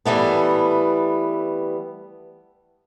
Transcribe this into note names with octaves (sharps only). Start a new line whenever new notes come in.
E3 G3 A3 B3